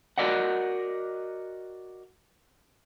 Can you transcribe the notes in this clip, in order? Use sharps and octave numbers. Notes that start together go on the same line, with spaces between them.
F#4 A#4 D5 D#5 F#5